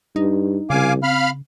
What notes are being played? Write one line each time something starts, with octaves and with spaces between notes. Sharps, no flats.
G2 D#4
C2 C#3 F5 G#5 D6
C4 F5 B5 F6